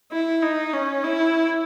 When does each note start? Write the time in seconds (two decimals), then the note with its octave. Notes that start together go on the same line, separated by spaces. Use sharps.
0.12 E4
0.42 D#4
0.73 C#4
1.04 E4